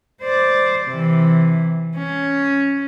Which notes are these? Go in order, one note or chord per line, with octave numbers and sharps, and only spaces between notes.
C5 D5
C3 E3
C#4